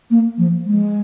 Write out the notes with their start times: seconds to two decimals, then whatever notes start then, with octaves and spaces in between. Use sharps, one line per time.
0.11 A#3
0.38 F3
0.66 G#3